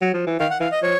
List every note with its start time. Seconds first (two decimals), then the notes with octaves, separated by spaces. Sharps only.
0.02 F#3
0.14 F3
0.27 E3
0.40 D#3 F5
0.50 F#5
0.60 E3 F5
0.72 D#5
0.82 F3 C#5